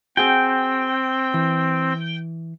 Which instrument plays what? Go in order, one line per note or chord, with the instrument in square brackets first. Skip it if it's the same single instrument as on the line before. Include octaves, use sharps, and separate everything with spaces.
[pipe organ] C4 [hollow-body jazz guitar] F#4 G#4 [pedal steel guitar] G5
[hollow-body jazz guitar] E3